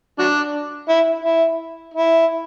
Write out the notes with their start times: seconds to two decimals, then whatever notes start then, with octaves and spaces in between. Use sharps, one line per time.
0.19 F#3 D4
0.89 E4
1.24 E4
1.94 E4